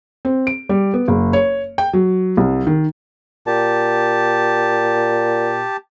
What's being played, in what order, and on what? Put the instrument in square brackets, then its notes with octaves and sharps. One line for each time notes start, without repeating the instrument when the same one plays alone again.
[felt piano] C4
D7
G3
B3
F#1
C#5
G5
F#3
C2
D#3
[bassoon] A#2 [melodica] G4 A5